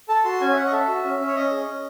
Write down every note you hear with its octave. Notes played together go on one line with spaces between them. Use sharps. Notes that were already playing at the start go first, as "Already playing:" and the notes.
A4 A5
F#4 C6
C#4 G#5
E5
C#4 F#5
D#5
A4 E5
F#4
C#4
C#4
C#5
C#4 D#5
G#4
C#4